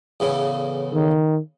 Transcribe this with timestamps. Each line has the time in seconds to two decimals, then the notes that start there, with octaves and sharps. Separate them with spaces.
0.20 E2 A2 C#3
0.93 D#3